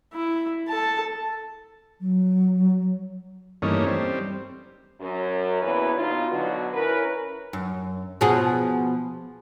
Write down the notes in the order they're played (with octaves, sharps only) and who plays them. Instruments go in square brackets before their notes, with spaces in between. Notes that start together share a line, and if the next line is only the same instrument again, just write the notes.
[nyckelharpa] E4
A4 A5
[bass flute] F#3
[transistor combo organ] G2 E3 A3 A#3 C#4 D#4
G3 C4
[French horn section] F#2
E2 B2 E3 A#3 B4 C#5
G2 B2 D#4 F4
B2 D3 F#3 F#4
C#4 E4 A#4 B4
[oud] F#2
B2 F3 G#4